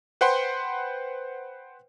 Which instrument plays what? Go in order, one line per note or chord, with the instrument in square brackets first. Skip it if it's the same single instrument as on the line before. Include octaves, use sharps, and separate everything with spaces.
[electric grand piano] B4 C5 F#5 G5 B5 C6